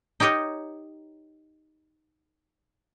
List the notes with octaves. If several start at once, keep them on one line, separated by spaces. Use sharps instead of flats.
D#4 G4 A#4 C#5 D#5